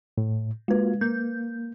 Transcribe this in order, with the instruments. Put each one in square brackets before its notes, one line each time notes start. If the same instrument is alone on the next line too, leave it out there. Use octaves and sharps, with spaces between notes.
[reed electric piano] A2
[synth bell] G#3 B4 [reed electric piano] A#3 F4 F#4
[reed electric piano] A#3 [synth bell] G6